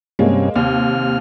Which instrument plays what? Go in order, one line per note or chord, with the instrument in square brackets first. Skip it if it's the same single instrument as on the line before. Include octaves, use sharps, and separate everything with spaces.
[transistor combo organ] G2 C3 C#4 [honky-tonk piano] G#3 A#3
[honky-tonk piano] D#2 [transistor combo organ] C3 F6